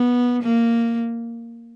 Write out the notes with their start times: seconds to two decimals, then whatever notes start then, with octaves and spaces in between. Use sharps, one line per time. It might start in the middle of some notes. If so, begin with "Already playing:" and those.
Already playing: B3
0.42 A#3